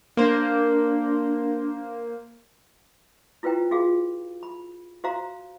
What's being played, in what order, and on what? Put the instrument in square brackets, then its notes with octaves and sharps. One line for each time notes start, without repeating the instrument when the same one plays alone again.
[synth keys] A#3 C5 [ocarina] D4
[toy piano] E4 F4 B4 C5 G5 A#5
F4 F#4 G#4 F5
B5
F#4 C5 F5 A#5